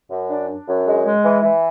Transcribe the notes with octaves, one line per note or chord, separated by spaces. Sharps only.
F#2
D4
D4
F#2
G#3
G#3
E3
E3